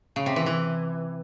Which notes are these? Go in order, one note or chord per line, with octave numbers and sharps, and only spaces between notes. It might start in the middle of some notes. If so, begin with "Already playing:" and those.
C#3
C3
E3
E3